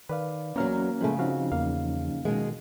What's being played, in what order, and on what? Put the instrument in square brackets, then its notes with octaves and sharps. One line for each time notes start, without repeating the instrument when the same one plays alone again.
[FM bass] D#3 [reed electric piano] B4 D5 F5
[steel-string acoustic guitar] E2 F#3 [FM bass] A#3 [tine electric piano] C#4 A#5 F6
[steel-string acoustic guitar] G2 C#3 [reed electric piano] F3 G#3 A3
[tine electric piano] F3 C#4 D#4 [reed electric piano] C4 F#4 F5
[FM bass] E2 [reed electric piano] A#3 F5
[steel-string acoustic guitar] B2 G#3 [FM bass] D#3